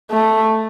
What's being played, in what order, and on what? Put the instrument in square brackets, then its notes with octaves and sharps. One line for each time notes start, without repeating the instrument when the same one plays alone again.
[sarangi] A3